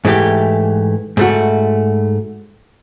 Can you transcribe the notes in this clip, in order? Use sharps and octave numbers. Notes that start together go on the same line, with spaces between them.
G#2 E3 A3 G4
G#2 A3 F#4